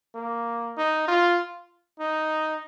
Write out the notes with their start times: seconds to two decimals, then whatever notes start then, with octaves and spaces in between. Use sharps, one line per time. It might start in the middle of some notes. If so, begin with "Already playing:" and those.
0.15 A#3
0.77 D#4
1.08 F4
2.00 D#4